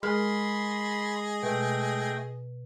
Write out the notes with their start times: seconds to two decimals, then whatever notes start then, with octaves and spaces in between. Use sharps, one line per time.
0.03 G#3 G#4 A#4 D#5 B5 C6 F6
1.43 B2 A3 G5